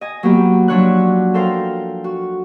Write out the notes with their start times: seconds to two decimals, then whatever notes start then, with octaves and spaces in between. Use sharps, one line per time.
0.01 D#5 G#5
0.23 F#3 A#3 B3 G4
0.68 F3 F#3 D4 C#5 E5 F#6
1.34 A4 A#4 C5 F5 G5
2.04 F#4